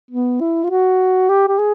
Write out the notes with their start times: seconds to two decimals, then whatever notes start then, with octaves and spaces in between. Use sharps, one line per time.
0.11 B3
0.41 E4
0.64 F4
0.71 F#4
1.29 G4
1.48 G4
1.59 G#4